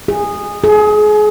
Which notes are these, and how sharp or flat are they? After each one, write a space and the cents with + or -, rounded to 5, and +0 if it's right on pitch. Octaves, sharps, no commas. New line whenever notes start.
G#4 -15
G#4 +30